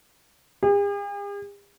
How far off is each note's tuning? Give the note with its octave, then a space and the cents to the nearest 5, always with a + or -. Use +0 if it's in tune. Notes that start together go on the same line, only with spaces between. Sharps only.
G#4 -45